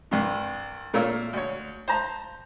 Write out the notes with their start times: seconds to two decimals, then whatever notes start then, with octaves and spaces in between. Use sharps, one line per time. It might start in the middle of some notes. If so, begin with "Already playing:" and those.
0.11 C2 G2 C3
0.94 A#2 A3 A#4 C#5 F5 E6
1.33 D2 C#5
1.88 C5 A5 A#5